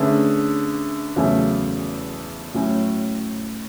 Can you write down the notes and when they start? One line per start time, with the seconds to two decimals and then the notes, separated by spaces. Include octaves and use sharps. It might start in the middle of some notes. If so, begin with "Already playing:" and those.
Already playing: D3 A3 C#4 G#4 B4
1.16 E2 C#3 F#3 A3 C#4
2.54 A2 F#3 C#4